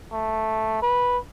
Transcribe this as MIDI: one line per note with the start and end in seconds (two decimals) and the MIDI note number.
0.12 0.82 57
0.82 1.17 71